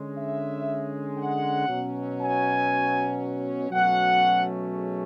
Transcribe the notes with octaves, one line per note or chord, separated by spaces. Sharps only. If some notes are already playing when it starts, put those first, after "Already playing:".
Already playing: D3 G#3 C#4
E5
F#5
B2 F#3 C#4
G#5
B2 F#3 A3 C#4 F#5
G#4